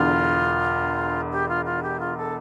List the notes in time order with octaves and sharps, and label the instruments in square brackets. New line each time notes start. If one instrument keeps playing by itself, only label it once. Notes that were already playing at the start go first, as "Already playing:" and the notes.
Already playing: [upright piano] E1 E2 D3 [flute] F4
[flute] G4
F4
F4
G4
F4
A4